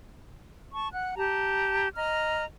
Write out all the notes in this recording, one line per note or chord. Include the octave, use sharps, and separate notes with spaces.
A5 C#6
F#5 F#6
G4 A5 A#5
D#5 A#5 F6